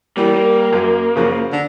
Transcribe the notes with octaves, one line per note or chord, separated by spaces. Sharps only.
E3 G3 A#3
A#3
F#2
F#2 C#3 F3 F#4
D3